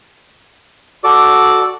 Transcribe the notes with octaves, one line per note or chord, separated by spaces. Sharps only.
F#4 A4 D5 D6